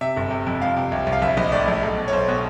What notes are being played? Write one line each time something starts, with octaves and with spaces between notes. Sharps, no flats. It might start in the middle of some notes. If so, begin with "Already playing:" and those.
C3 E5
G1
C3
F2
F3 F5
C3
C2
C2
F5
A#1 E5
A#1 D#5
A2 D5
A#1
B1
B2
C#5
B1 C5
B2